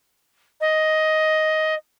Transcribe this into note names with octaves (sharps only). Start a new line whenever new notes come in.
D#5